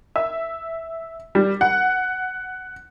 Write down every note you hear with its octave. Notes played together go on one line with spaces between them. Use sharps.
E5
G3
F#5